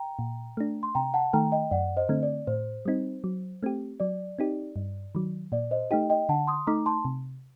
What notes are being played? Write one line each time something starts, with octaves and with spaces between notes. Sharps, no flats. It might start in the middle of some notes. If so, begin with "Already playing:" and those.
Already playing: G5 A#5
A#2
A3 D4
C6
C3 G5 A#5
F#5 A5
D#3 A3 G5 A#5
D#5 G5
F#2 D5 F#5
C5 D#5
D3 A3 C4
D5
A2 C5
G3 C4 D#4
F#3
A3 C4 G4
F#3 D5
C4 D#4 G4
G2
D#3 F#3
A#2 D5
C5 D#5
A3 D#4 G4 D#5 G5
D#5 G5
D3 F#5 A5
C6 D#6
A3 D#4 A#5 D6
A5 C6
C3